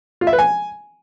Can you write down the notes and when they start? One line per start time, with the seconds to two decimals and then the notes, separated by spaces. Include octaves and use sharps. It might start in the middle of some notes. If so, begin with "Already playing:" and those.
0.21 F4
0.27 E5
0.33 B4
0.39 G#5